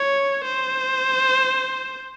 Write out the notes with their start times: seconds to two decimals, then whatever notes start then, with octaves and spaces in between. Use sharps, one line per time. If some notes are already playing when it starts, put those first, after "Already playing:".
Already playing: C#5
0.44 C5